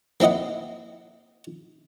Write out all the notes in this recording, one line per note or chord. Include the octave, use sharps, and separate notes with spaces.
A#3 C4 E4 D#5 F#5